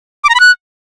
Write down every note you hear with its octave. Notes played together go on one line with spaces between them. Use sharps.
D6
A#5
B5
F#6